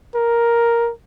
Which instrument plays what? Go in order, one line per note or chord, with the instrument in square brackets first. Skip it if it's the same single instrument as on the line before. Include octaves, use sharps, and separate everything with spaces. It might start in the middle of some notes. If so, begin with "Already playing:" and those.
[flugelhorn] A#4